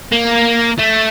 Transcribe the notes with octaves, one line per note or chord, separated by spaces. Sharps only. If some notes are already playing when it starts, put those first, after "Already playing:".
A#3
A3